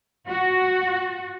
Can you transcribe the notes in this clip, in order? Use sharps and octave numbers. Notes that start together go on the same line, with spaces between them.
F#4